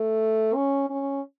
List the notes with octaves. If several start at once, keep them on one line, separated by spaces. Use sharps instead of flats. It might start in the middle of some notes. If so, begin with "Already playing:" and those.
Already playing: A3
C#4
C#4